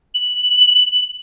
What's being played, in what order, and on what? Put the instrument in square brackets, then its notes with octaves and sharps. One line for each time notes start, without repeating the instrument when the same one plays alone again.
[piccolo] F#7